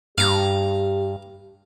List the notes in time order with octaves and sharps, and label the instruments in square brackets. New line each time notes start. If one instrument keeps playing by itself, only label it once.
[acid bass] G2 [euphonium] G4 [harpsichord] F5 A#5